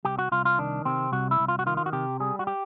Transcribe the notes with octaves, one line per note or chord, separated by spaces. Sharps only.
C2 G4
F#4
C2 F4
F4
D#3 D4
C3 C4
C2 F#4
E4
C2
F4
F#4
D#3 F4
F4
F#4
C3 G4
G3 G#4
F#4
G4